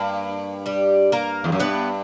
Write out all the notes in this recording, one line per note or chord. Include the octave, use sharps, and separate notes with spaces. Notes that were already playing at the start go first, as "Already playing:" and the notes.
Already playing: G2 A#3 A#4
G3 G4
A#3 A#4
E2
F#2
G2 B3 B4